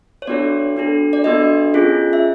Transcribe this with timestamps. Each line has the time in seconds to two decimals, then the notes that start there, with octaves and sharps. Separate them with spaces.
0.22 C#5
0.27 B3 D4 F#4 A4 D5
0.77 D4 F#4 A4
1.13 D5
1.24 B3 D4 F#4 A4 D#5
1.74 C#4 F4 G#4
2.13 E5